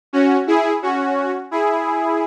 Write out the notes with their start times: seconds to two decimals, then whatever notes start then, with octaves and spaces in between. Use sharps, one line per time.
0.13 C#4 F#4
0.47 E4 G#4
0.82 C#4 F#4
1.51 E4 G#4